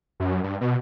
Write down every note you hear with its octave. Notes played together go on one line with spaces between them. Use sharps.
F#2
G2
B2